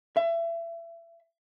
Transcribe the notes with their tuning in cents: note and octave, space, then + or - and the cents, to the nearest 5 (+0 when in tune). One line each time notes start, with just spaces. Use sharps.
E5 +30